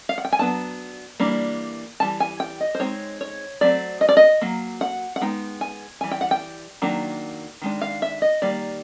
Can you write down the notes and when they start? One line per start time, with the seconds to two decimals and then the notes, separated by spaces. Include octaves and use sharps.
0.09 F5
0.18 F#5
0.25 G5
0.32 G#5
0.39 F#3 B3 D4 A5
1.20 E3 G3 A#3 D4
2.00 E3 G3 A5
2.20 G#5
2.40 G5
2.61 D#5
2.75 C5
2.80 G#3 C4 D#4 C#5
3.21 C#5
3.61 F#3 A3 C4 D5
4.01 D#5
4.09 D5
4.17 D#5
4.41 F#3 A#3
4.81 F#5
5.16 F#5
5.21 G#3 B3 D#4 G5
5.61 G#5
6.01 E3 G3 G#5
6.11 G5
6.21 F#5
6.31 G5
6.82 D#3 F#3 A#3 D4
7.62 D#3 G#3 D4
7.81 F5
8.02 E5
8.22 D#5
8.42 D#3 G3 A#3 D5